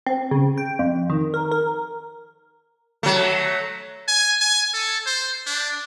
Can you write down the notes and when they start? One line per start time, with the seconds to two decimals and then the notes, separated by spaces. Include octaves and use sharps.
0.06 C4
0.31 C#3
0.58 G5
0.79 F2
1.10 D#3
1.34 A#4
1.52 A#4
3.03 F#3 A3
4.08 G#5
4.41 G#5
4.74 A4
5.06 C5
5.46 D4